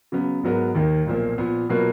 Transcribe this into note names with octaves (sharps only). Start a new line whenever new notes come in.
C#3 F#3 B3
G#2 F#3 B3 F#4 A#4
D#2 D#3 A#3
B1 A#2 F3 A#3
A#2 F3 B3
B2 F#3 A#3 F4 B4